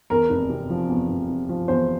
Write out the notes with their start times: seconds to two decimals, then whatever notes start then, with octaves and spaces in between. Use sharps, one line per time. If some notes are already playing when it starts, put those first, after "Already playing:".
0.10 E2 A#4
0.30 F1
0.50 C3
0.70 F3
0.89 E2
1.09 F1
1.29 C3
1.49 F3
1.68 E2 C5